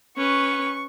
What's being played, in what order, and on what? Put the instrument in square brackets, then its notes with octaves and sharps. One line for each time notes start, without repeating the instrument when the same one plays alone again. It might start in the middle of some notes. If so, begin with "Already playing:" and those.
[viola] C#4 B4 [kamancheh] C#6